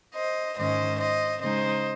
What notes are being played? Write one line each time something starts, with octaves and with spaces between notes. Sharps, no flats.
C5 D#5
G#2 D#3 G#3 C#4 C5 D#5
C5 D#5
C#3 G#3 D#4 C5 D#5